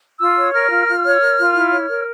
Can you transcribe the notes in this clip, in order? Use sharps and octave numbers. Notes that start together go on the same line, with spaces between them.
F4 E6
C#5
A#4 F6
F4
F4
C#5
A#4
F4
E4
C#5
A#4